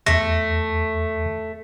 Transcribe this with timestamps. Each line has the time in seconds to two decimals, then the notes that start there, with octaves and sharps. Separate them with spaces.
0.06 E2 A3 A#6